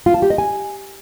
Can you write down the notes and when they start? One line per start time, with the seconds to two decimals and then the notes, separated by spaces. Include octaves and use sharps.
0.06 F4
0.14 A5
0.22 G4
0.30 D#5
0.38 G#5